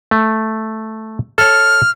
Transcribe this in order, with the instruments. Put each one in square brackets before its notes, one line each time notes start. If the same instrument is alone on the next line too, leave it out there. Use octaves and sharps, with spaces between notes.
[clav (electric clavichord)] A3
[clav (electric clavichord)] A4 C#5 [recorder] F6